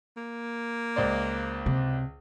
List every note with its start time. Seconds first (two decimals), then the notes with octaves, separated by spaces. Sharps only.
0.17 A#3
0.96 C#2 C5 D5
1.66 C3